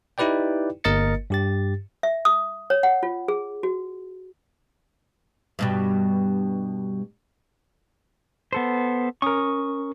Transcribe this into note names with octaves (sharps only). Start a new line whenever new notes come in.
D#4 E4 G4 B4 D5 G5
G1 A#3 A#4 D#5 A6 C#7
G2 G4 A6
E5
D#6
C#5
F#5
F4
G#4
F#4
G2 B2 G3
B3 A4 C5
C#4 A#4 C#6 D#6